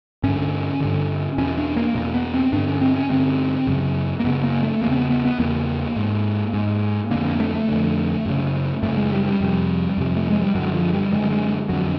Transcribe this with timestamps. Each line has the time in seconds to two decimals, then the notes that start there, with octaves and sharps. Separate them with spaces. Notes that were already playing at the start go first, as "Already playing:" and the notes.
0.23 G2 D3 C#4
0.80 G2 D3
1.38 E2 B2 C#4
1.57 D4
1.77 A#3
1.95 E2 B2 A#3
2.14 B3
2.34 C4
2.52 G2 D3 D4
2.67 C#4
2.81 C4
2.95 C#4
3.09 G2 D3 C4
3.67 F#2 C#3
4.19 A#3
4.24 F#2 C#3 B3
4.43 A#3
4.63 A3
4.82 E2 A#3
4.86 C#3
4.91 C4
4.96 B3
5.10 B3
5.25 B3
5.39 E2 C#3 A#3
5.96 G#2
6.54 G#2
7.11 F2 D3 A#3
7.25 A#3
7.40 A3
7.54 A3
7.68 F2 D3
8.26 F#2 C#3
8.82 F#2 C#3 A3
8.97 G#3
9.12 G3
9.26 G3
9.40 F2 C3
9.97 F2 C3
10.17 A3
10.30 G#3
10.42 G3
10.55 F#2 D3 F#3
10.74 F3
10.93 G3
11.12 F#2 D3 G#3
11.31 G#3
11.69 F2 D3 F#3